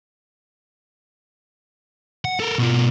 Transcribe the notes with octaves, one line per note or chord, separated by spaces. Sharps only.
F#5
A4 A#4
B2 F4